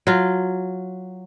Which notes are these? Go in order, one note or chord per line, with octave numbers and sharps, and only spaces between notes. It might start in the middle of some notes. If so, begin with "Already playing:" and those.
F#3 F4